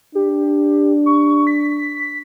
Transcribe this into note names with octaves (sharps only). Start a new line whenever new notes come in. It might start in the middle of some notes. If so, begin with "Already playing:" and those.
D4 G4
C#6
B6